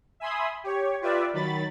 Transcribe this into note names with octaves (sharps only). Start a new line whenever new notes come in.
E5 G#5 B5 C6 D#6
G4 C#5
F4 G4 B4 D5 E5
D#3 F#3 B5 A6